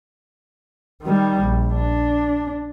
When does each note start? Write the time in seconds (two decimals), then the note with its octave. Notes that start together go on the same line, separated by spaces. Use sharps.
1.02 D#3 G3
1.41 A#1
1.74 D4